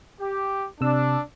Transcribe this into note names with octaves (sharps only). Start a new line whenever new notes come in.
G4
C3 D4 E6